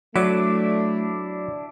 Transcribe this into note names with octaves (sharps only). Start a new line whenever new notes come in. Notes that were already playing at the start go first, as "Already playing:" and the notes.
F#3 A3 D4 E4 D5 D6